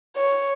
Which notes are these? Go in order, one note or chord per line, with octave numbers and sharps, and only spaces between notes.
C#5